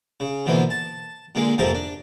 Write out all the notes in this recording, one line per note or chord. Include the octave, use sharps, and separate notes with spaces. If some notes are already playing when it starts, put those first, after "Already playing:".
C#3
B2 D3 E3 F3 A#3
A5
A#2 D3 G#3 A#3
F2 G#2 C3 A#3 A#4 A5
D4